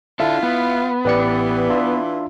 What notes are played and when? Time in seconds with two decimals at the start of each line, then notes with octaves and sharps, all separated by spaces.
0.20 D4 E4 F4 A4 E5
0.43 B3
1.05 A1 E3 G4 B4 D5 C#7
1.70 D4 F4 E5